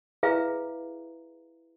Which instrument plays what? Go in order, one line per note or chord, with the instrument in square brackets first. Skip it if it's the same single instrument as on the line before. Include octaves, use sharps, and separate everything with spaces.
[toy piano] E4 G#4 B4 E5 F5 A#5